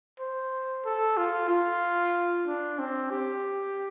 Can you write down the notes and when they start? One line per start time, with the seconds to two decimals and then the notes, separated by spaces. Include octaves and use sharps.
0.20 C5
0.86 A4
1.17 F4
1.49 F4
2.47 D4
2.79 C4
3.11 G4